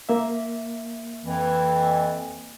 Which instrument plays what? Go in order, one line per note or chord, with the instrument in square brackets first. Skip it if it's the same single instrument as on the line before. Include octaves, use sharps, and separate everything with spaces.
[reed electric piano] A#3 E5
[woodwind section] F2 E3